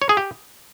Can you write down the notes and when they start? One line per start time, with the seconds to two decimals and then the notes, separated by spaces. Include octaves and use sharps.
0.02 C#5
0.09 G#4
0.17 G4